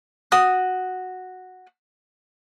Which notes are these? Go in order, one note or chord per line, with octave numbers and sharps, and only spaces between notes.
F#4 D#6